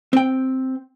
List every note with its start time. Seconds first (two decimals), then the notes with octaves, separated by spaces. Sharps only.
0.13 C4 G5